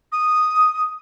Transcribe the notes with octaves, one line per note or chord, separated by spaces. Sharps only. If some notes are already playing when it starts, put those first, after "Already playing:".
D#6